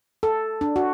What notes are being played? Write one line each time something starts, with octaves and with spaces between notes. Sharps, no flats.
A4
D4
F#4